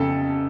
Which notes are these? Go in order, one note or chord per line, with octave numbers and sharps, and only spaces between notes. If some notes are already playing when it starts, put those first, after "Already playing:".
Already playing: F2 C#3 A4 A5